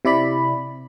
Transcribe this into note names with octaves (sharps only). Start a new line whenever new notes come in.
C3 E4 D5 B5